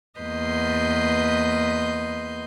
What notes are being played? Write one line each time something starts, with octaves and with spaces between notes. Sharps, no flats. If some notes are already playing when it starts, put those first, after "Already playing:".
E2 A#3 B4 D#5 C6 G6